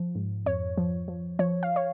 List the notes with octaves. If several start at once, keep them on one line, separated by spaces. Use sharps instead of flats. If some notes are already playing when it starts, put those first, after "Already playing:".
Already playing: F3
G#2
F2 C#5
F3
F3
F3 C#5
F5
C#5